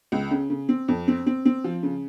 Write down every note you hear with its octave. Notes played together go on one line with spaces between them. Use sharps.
C#2
C#3
C#3
C4
F2
C4
C4
C4
F3
C#3